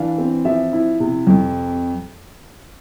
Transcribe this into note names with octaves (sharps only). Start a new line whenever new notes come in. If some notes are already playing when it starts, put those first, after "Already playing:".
Already playing: E3 D4 F5
C4
F3 E5
E4
C3
F2